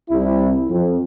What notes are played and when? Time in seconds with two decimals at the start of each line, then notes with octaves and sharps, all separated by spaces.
0.10 C2 E4
0.69 F2